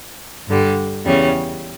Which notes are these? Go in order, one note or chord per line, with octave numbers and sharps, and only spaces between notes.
G2 D3 G3
E2 C#3 G3 C#4